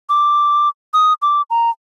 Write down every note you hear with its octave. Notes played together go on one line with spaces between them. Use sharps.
D6
D#6
D6
A#5